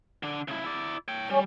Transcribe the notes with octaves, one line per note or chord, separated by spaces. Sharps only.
D3 D4
C#3 E4
E4 D5
C#5 G5
G3 C#4